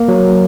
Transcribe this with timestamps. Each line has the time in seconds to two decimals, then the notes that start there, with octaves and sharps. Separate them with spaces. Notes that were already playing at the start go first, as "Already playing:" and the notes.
Already playing: A#3
0.08 F#3